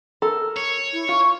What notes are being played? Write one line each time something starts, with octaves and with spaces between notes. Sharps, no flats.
A4 A#4
C#5
E4
F4 C#6